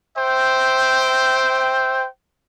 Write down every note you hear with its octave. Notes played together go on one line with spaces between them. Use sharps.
C5 E5 G5